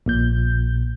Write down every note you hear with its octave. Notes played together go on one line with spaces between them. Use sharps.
A#1 A#2 G6